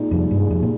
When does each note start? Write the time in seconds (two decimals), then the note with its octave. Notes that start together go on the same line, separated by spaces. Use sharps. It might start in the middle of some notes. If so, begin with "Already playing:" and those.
Already playing: A#2 G#3 D#4
0.11 C2 F2
0.31 G2
0.37 G#3
0.50 F2
0.62 A#2